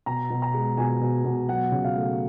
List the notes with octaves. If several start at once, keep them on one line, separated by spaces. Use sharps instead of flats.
B2 A#5
B2
A#5
G#3
B2 G#5
B2
B2
F#3 F#5
C#3
F5
A3